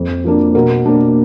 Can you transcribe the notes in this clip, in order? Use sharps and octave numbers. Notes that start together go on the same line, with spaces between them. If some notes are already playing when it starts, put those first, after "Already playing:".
Already playing: F2
F3 A#3 D4
B2 A#4
A#3 D4